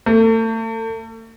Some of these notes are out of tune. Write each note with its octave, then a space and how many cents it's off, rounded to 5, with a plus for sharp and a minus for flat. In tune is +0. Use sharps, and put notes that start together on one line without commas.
A3 +35